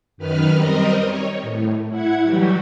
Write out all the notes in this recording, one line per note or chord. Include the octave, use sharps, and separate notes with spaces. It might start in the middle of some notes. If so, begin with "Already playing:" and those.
F#2 D#3 B4 F6
G3 C4 A#4 D#5
C#5
A2
E4 F#5 G#6
E3 F#3 G3 F#4 G4